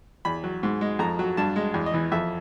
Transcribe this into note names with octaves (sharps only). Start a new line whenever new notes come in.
E2 B5
F#3
G#2
G#3
F2 A#5
F#3
G2 A5
G#3
E2
D#5
E3
F2 E5